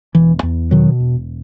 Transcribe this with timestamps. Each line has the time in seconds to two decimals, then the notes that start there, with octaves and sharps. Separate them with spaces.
0.15 E1 E3
0.43 E2
0.71 B2 D#3 F#3
1.00 E1